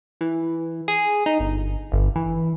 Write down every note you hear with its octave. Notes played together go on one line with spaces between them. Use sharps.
E3
G#4
D#4
G1
G1
E3